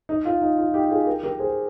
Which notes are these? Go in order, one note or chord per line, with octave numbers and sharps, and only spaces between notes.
D#4
F4
D#4
F4
D#4 G4
F4 G#4
G4 A#4
G4 A#4
G#4 C5